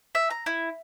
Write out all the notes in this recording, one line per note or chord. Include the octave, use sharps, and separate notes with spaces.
E5
A#5
E4